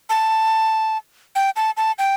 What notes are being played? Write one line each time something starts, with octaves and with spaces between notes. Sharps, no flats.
A5
G5
A5
A5
G5